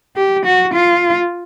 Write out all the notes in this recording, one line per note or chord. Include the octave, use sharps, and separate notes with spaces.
G4
F#4
F4